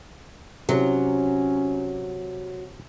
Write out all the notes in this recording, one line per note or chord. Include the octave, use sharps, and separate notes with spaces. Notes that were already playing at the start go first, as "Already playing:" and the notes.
C3 F#3 C#4